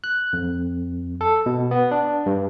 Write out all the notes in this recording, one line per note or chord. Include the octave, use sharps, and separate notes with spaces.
F#6
F2
A4
B2
B3
D4
G2